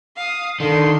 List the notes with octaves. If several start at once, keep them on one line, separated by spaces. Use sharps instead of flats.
F5 D#6
D3 D#3 C6